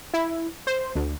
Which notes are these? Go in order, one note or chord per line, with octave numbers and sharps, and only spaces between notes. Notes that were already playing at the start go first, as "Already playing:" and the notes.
E4
C5
D2